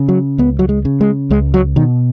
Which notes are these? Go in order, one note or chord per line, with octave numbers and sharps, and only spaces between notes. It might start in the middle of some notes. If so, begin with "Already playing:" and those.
Already playing: C#3
F#3
C#2 B3
F#3
G#3
C#3
G#3
C#2 G#3
F#3
B2 D#3